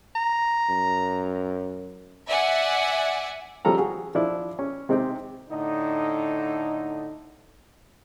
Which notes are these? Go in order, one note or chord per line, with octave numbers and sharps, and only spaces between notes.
A#5
F#2
D5 E5 F#5 G#5
C#3 F3 G3 A4 A#5
F#4 G#4
F3 D4 E4
C#4
C3 G#3 C4 D#4 G4
A2 D3 D#4